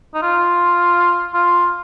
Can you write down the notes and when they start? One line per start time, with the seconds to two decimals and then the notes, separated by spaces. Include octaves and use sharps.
0.14 D#4
0.23 F4
1.34 F4